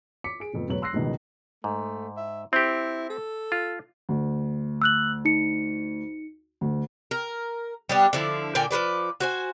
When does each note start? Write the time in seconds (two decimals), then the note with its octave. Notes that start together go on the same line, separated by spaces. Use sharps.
0.24 D6 B6 C#7
0.40 G#4 D7
0.54 F1 F2 B3
0.69 E1 F#3 B3 C#5 F#7
0.82 C6 E6 F#6 A#6 C7
0.93 G1 C#2 B2 D#3
1.64 G#2 A3
2.17 E5
2.53 C4 E4 G4
3.10 A4
3.52 F4
4.09 D2
4.82 E6 F#6 F#7
5.25 D#4 C#7
6.61 D2
7.11 A#4
7.89 G3 B3 D4
8.13 D3 F3 E4
8.55 A#2 D3 G5 G#5
8.71 F3 G#3 B4 D5
9.20 F#4 C5 G#5